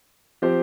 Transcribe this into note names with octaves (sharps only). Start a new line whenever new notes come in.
F3 C4 G4 C5